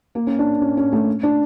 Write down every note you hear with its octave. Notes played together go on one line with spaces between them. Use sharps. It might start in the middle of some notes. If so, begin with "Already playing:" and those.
A#3
C#4
D4
C#4
C#4
A3
D4